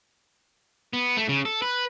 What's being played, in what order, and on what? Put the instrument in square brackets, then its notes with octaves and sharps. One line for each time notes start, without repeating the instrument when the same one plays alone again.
[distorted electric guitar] B3
A3
C#3
A4
B4